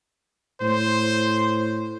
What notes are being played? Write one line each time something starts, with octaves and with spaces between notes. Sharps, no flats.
A2 C5